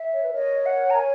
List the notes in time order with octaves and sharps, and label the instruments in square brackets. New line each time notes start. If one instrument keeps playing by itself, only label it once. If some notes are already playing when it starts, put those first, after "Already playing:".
Already playing: [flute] E5
[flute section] C#5
B4
A#4 C#5
[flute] D#5
F#5
A#5
G#5